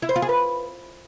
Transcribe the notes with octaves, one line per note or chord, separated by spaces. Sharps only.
E4
C5
F4
G#4
B4